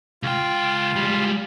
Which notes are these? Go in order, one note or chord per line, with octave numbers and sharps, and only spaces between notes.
C#2 F4 G5
G3 G#3